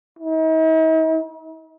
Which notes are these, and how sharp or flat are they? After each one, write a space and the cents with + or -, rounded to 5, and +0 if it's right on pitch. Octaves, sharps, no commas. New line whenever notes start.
D#4 +45